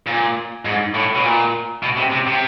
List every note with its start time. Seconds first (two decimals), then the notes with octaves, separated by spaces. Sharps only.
0.06 A#2
0.65 G#2
0.95 A2
1.15 B2
1.25 A#2
1.83 B2
1.97 C3
2.12 C3
2.27 C3